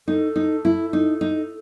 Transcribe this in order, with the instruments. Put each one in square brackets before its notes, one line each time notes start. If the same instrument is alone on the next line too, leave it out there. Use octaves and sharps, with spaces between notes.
[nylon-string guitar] D#4 [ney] A4
[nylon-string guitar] D#4
E4
D#4
D#4